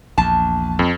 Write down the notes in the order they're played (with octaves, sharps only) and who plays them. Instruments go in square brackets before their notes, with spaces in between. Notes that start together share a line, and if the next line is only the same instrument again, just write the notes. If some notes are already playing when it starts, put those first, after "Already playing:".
[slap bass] A#1 E2 [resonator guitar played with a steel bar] A5
[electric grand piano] F2